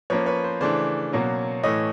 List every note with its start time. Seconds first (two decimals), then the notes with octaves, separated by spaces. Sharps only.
0.10 F3 A#3 C#4 B4 C#5
0.26 B4 C#5
0.44 C5
0.61 C#3 E3 A3 D4 C5 D5
1.12 B2 F#3 A#3 C#4
1.63 A2 E3 A3 C#5 D#5